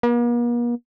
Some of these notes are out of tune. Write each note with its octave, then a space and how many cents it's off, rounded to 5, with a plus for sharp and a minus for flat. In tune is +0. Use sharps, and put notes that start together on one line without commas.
A#3 +45